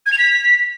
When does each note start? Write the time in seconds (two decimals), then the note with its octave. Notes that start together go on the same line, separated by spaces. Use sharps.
0.06 G#6
0.12 F7
0.18 B6